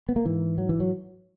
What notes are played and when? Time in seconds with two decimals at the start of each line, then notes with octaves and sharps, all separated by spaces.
0.09 B3
0.16 A#3
0.25 G#2 E3
0.58 F#3
0.69 E3
0.80 F#3